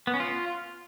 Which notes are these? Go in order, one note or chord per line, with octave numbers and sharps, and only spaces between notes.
B3
C#4
F4